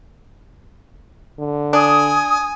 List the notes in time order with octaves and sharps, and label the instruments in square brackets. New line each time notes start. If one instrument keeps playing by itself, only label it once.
[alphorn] D3
[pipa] D4 [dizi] G#5 [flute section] D#6